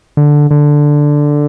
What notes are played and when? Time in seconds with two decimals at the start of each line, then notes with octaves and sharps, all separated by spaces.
0.17 D3
0.51 D3